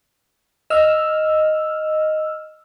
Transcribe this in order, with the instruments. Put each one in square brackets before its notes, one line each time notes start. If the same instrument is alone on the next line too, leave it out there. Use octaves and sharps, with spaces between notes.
[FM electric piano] D#5 E6 F6